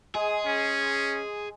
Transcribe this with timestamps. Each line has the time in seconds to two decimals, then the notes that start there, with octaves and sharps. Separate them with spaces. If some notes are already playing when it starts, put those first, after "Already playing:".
0.15 G#3 G#4
0.45 C#4